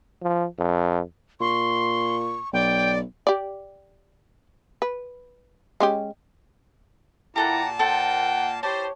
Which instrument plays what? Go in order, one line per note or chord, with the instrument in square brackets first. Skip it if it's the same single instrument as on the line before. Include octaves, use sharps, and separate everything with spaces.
[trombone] F3
F2
[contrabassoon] A#2 [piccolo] C6 [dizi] C#6
[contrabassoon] B1 [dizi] D5 [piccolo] G5
[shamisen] G4 D5
B4
G#3 C#4 G4
[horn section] A#2 A#3 A5 [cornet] E4 [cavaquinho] G4 A4 F#5 [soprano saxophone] A#5
[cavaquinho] A4 C5 [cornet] F#5 [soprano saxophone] G5
[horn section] E4 G4 C5 [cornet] C#5 [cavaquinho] A5